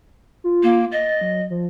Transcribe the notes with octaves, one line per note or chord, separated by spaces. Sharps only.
F4
A#3
D#5 A6
F#3
F3